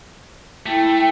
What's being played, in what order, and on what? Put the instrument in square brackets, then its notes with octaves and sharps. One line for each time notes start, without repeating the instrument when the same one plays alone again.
[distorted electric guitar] A3 [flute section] E4 G5